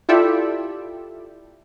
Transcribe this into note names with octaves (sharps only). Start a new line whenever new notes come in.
E4 F4 G4 A4 D5 E5